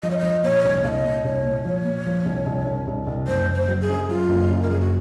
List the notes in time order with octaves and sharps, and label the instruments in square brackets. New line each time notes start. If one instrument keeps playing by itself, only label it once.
[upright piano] F3 [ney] D#5
[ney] C#5
[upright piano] F3 [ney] D#5
[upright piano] A#2 [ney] C#5
[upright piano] C2
[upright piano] C2 [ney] D#5 F5
[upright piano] A#2
[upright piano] C2 [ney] C#5
[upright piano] A#2
[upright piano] F3 [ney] C#5
[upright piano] A#2
F3
C2
C2
C2
C2
C2
[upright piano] F#1 [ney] C5
[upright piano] F#1
[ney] C5
[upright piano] F#3
[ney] G#4
[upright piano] F#2
[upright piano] F#3 [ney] F4
[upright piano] F#1
F#2
[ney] A#4
[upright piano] F#1 [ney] G#4
[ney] F#4